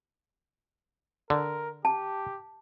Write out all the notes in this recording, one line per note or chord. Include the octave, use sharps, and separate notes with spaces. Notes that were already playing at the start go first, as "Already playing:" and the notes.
D3 A#4
G4 A5